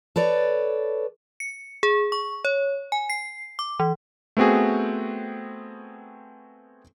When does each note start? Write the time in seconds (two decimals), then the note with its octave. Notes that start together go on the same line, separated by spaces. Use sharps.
0.16 A4 B4 C#5 D5
1.40 C#7
1.83 G#4
2.12 C#6
2.45 C#5
2.92 G#5
3.10 C7
3.59 D6
3.80 E3
4.37 A3 B3 C4 F#4 G#4